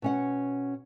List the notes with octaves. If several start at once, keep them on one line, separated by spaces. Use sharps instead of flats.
B2 C#4 F#5